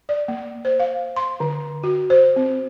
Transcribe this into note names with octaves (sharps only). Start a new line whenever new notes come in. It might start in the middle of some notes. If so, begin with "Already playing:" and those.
D5
A#3
C5
F5
C6
D3
F#4
C5
C4